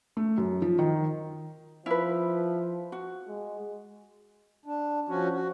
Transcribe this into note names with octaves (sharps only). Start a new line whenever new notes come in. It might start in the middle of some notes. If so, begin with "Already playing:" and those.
A3
F#2
F3
D#3
F3 E4 B4
F#4
G#3
D4
F3 C#4 F#4
F#4